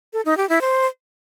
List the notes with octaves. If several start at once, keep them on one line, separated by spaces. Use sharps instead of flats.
A4
D#4
G4
E4
C5